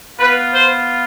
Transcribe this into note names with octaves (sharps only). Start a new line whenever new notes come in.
B3 F4 B4
C5